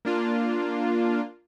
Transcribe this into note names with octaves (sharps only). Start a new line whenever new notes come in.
A#3 D4 F4